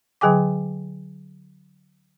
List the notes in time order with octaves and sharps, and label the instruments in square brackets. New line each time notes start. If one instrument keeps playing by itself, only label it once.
[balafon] D3 F#3 G#4 G5 G#5 D6